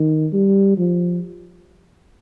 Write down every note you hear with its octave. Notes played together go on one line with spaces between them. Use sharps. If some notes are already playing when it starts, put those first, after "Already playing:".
Already playing: D#3
G3
F3